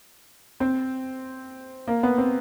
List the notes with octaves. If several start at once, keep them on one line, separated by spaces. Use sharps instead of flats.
C4
A#3
B3
C4